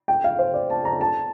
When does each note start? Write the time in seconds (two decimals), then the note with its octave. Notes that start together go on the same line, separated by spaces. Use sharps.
0.08 G5
0.24 F5
0.39 C5
0.54 D5
0.70 A5
0.85 A#5
1.01 A5